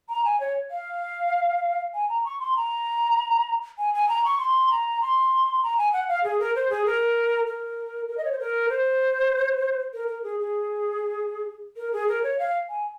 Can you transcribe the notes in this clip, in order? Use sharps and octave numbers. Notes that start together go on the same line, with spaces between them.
A#5
G#5
C#5
F5
G#5
A#5
C#6
C6
A#5
G#5
G#5
A#5
C#6
C6
A#5
C6
A#5
G#5
F#5
F5
G#4
A#4
C5
G#4
A#4
A#4
A#4
D#5
C#5
C5
A#4
C5
A#4
A#4
G#4
G#4
A#4
G#4
A#4
C#5
F5
G#5